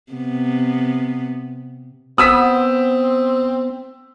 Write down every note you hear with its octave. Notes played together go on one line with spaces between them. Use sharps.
C3 B3
B3 C4 D#6 E6 B6